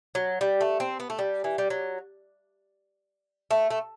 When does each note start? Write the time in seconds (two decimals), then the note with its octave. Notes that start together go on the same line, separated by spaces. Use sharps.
0.15 F#3
0.41 G3
0.61 A3
0.80 C4
1.00 B3
1.10 A3
1.19 G3
1.44 E3
1.58 G3
1.70 F#3
3.51 A3
3.70 A3